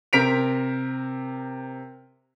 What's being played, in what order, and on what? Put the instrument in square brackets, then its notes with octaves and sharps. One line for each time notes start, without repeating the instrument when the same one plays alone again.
[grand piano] C3 A#4 C5 B6 D7 F7